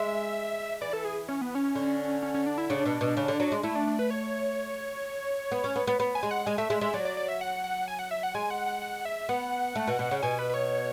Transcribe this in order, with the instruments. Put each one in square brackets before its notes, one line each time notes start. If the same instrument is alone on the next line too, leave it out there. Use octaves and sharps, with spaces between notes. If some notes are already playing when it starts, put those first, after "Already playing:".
Already playing: [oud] G#3 [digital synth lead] E5
[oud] E3 [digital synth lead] D5
[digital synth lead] A4
G#4
C#4
B3
C#4
[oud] D3
[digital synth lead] C#4
C#4
D4
E4
[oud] C#3 [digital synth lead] D4
[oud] B2
B2
C#3
D3
F#3
G#3
[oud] A3 [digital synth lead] E4
[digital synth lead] D4
D4
B4
C#5
[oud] B3
C#4
B3
B3
B3
[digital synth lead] G#5
[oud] G#3
[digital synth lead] F#5
[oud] G#3 [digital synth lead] G#5
[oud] A3 [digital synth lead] E5
[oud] G#3 [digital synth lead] E5
[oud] G#3 [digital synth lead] E5
[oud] F#3 [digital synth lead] D5
[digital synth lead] D5
D5
E5
F#5
F#5
G#5
F#5
E5
F#5
[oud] G#3 [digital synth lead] G#5
[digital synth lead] F#5
F#5
F#5
E5
[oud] B3 [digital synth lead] F#5
[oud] A3
B2
B2
C#3
[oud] B2 [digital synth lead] G#5
[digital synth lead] B4
B4
C#5